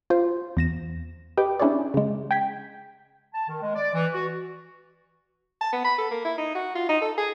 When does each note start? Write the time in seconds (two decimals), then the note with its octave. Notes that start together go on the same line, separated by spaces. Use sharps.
0.10 F4 C5
0.57 E2 A#6 E7
1.37 G4 B4 D#5 G5 D6
1.59 C#4 D4 E4 G#4 C#5 D5
1.94 C#3 G#3
2.31 G5 G#6 B6
3.34 A5
3.48 D#3
3.62 G#3
3.75 D5
3.94 E3
4.13 F#4
5.61 A5
5.72 B3
5.84 B5
5.98 A4
6.11 A#3
6.25 E4
6.38 D#4
6.55 F#4
6.75 F4
6.89 D#4
7.01 A4
7.18 G#4